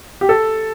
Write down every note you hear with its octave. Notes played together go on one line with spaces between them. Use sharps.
G4
A4